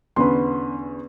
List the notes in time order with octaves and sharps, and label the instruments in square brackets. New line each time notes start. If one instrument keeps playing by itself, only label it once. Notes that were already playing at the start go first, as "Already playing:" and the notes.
[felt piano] E2 D3 C#4 [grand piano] B4 C6